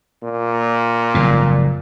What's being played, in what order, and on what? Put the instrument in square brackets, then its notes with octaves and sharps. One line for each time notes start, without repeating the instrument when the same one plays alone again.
[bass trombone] A#2
[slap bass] F#1 F2 G#2